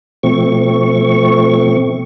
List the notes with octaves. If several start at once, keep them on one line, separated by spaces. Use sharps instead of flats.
B2 F3 A3 C4 C#6